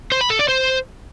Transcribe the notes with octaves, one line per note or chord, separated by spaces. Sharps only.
C5
B5
A4
D5
C5